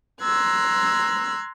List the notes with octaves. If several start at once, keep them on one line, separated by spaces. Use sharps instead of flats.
A#5 C6 E6 F#6 G#6